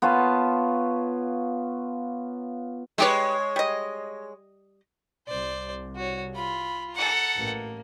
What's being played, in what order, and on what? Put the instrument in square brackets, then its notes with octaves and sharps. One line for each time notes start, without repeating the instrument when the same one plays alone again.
[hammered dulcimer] B3 F4 C#5 A5
[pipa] G3 G4 B4 [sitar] G#3 C#5
[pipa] G3 D#5
[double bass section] C2 [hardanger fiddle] C5 D5
[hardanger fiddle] F#4 C#5
[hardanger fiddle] F4 [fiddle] B5
[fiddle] A4 F#5 [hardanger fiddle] A#5
[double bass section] A1 [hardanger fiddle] A#3